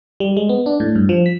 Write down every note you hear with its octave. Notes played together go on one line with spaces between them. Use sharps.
G3
G#3
B3
D4
A2
G2
F3
B6